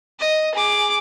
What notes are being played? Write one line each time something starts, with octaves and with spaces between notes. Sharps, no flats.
D#5
G#4 D6